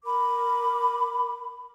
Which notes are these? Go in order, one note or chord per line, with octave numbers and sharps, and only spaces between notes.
A#4 B5 D6